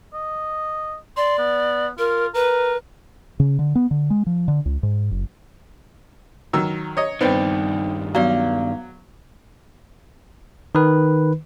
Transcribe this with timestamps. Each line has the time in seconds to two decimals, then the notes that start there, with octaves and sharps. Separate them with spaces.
0.13 D#5
1.17 D5 C6
1.38 B3
1.98 F4 A#4
2.34 A#4 B4
3.40 C#3
3.59 D3
3.75 B3
3.91 D3
4.10 G#3
4.26 F3
4.48 D3
4.66 C#2
4.83 G#2
5.11 F#1
6.53 D#3 F#3 E6
6.97 C#5 D#5
7.21 G2 D#3 B3 C4 D#4 D5 G5
8.15 F#3 B3 D5 F5
10.75 D#3 B4